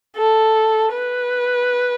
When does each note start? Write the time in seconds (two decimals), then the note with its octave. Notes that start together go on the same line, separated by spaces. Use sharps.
0.17 A4
0.93 B4